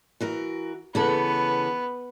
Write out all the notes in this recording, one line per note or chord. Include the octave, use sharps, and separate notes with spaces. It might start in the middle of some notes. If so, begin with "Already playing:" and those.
E3 F#4 A#4
C#3 E3 B3 A4